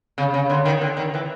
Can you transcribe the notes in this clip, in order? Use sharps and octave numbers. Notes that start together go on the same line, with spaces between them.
C#3
C#3
D3
D#3
D3
D#3
E3